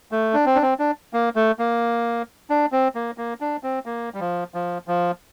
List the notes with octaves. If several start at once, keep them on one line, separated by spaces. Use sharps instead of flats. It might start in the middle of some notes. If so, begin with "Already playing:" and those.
A3
D4
C4
D4
C4
D4
A#3
A3
A#3
D4
C4
A#3
A#3
D4
C4
A#3
G3
F3
F3
F3